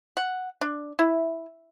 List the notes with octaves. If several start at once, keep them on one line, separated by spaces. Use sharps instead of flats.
F#5
D4
E4